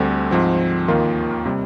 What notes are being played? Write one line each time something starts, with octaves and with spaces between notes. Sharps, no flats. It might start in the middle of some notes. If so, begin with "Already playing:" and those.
Already playing: D2 D3 G3 C4
G#2 F3 C4
D#2 D#3 A#3 F4
C3 G3